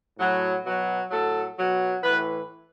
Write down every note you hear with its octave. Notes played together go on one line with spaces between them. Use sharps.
A2 F#3
B2 F#3
A2 F#3 A4
B2 F#3
A2 E3 B4